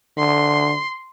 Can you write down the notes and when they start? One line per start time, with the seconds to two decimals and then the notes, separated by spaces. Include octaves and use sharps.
0.17 D3 C6